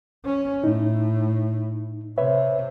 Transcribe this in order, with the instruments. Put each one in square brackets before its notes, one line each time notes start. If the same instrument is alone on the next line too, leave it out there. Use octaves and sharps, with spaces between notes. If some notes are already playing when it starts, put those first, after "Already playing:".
[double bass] C#4
[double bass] A2 [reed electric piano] D#4
[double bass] C3 [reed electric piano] B4 C#5 E5